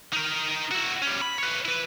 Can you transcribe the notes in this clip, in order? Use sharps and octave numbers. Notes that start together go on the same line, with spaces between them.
D#4 A#4
E4 F#4
G3 C#4
B5
B4 C#5
E4 B4